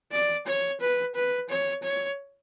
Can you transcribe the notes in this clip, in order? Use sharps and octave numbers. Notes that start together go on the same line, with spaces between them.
D5
C#5
B4
B4
C#5
C#5